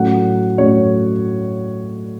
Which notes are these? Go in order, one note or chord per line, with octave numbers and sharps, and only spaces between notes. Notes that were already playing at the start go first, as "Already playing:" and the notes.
Already playing: A2 F#3 C#4 F#5
A2 F#3 C#4 C#5